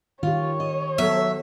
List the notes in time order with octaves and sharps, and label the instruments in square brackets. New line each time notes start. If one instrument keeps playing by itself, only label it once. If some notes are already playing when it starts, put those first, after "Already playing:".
[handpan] D#3 G4 [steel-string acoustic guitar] F4 [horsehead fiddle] C#5
[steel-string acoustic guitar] D#5
[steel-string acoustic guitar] F#3 [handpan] B3 A4 [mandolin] E5